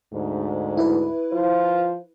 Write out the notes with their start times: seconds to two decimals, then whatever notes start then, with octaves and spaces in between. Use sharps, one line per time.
0.13 D2 G#2
0.77 E4 B4
1.33 F3 F4 C5